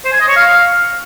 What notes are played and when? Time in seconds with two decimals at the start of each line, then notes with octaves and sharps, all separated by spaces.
0.05 C5
0.13 G#5
0.20 D#5
0.28 C#5
0.36 F5